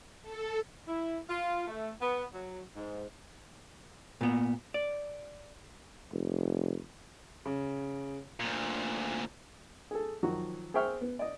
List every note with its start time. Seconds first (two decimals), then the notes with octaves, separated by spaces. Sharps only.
0.23 A4
0.87 E4
1.29 F4
1.67 A3
2.00 B3
2.33 F#3
2.75 G#2
4.21 A#2 B3
4.74 D5
6.12 F1
7.45 C#3
8.40 D2 A#2
9.91 G#4 A4
10.23 D#3 F3 F#3 F#4
10.74 G#4 C5 E5 G5 C#6 F6
11.01 B3
11.19 D5 D#5